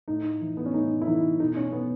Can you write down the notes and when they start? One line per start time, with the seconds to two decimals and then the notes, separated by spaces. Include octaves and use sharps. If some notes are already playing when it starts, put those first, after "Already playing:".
0.08 A2 D#4
0.41 E3
0.57 B3
0.66 C#4
0.74 A2 D#4
1.02 E4
1.07 E3 D#4
1.40 B2 D#4
1.56 C#4
1.72 B3